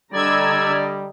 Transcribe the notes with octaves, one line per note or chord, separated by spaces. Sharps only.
D3 G3 D5 D#5 A#5 E6 G#6